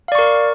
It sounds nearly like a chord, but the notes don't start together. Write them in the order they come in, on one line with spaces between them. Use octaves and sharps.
F5 D5 C#6 A#4